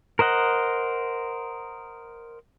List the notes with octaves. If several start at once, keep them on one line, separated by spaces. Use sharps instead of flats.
A#4 C5 D#5 F#5